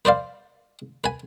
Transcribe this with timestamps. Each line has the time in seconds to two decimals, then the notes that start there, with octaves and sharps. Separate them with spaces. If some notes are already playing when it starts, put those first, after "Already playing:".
0.05 B4 C5 D5 F5
1.04 B4 G#5